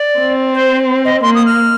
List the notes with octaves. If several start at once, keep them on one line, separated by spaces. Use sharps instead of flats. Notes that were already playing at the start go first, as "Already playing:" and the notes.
Already playing: D5
C4
C5
D#5
A#3 C6
D#6
F6